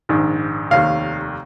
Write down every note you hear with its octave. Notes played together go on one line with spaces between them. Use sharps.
A#1 G#2 D#3
F1 D#2 D#3 F5